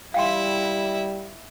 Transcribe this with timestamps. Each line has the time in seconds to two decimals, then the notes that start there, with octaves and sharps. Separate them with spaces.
0.14 G3 E4 E5 F5 G5 C6